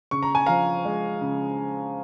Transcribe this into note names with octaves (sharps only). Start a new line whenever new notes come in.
C#3 C#6
A#5
G#5
F3 F5 A#5
G#3
C#3